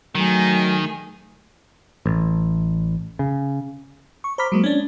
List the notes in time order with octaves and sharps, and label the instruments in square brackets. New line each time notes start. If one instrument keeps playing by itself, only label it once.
[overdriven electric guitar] D#3 [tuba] F#3 [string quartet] A3 G#4
[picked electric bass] A1
C#3
[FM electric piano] C#6
C5 A#5 B5 D6 F6 B6
F#3 G#3 A#3
C#4 D4